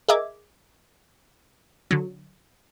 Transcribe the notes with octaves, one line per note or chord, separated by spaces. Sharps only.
G#4 A#4 D#5 E5 D6 G#6
D3 F#3